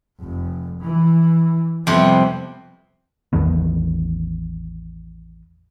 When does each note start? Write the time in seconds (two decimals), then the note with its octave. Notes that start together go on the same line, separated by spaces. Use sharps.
0.18 F1
0.83 E3
1.87 F2 C3 G3 B3
3.33 A1 E2 D#3 B3